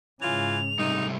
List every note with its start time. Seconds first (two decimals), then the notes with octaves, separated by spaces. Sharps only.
0.22 G#2 C#3 E3 C#4 F4 F7
0.79 C3 G3 A3 D#4